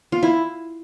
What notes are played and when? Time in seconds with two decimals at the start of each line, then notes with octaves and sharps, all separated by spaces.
0.12 F4
0.23 E4